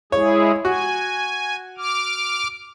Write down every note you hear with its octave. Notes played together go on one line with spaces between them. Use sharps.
G#3 E4 G#4 C#5
F#4 G#5
D6 F6